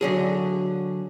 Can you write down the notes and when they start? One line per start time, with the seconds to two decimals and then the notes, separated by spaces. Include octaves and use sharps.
0.01 D3 F#3 G#4